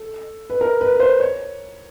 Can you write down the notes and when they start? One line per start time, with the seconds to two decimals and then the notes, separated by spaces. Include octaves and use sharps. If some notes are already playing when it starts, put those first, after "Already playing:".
Already playing: A4
0.50 B4
0.61 A#4
0.81 B4
0.95 B4
1.00 C5
1.20 C#5